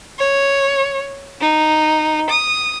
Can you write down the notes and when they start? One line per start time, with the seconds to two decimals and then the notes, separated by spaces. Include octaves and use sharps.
0.19 C#5
1.41 D#4
2.30 D#6